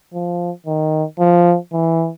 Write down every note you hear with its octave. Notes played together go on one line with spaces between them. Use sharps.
F3
D#3
F3
E3